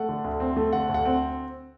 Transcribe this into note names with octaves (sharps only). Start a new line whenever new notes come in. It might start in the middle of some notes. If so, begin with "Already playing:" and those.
Already playing: A3 F#5
D3
D2
C4
A3
D3 F#5
D2
F#5
C4